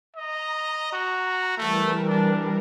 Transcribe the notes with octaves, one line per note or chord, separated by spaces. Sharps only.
D#5 A#5
F#4
E3 G3 A3 A#4
D4